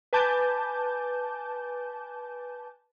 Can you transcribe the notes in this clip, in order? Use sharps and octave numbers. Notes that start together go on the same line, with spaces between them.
B4 G#5 A5 D6 G6